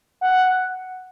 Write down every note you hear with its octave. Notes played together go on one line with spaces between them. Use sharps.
F#5